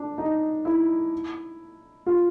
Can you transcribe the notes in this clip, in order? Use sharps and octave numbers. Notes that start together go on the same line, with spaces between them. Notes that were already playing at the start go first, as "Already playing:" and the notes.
Already playing: D4
D#4
E4
F4